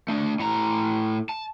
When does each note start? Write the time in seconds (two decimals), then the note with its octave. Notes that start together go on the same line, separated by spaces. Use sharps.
0.08 A3 D4
0.40 A2 A#5
1.29 A5